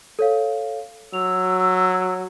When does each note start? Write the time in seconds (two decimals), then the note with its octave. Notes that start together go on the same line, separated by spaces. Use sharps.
0.19 A4 C#5 F5
1.13 F#3 E6 F7